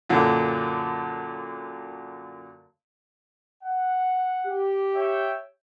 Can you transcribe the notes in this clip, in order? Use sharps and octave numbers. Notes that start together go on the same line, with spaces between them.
F#2 A#2 D3
F#5
G4
C#5 E5 G5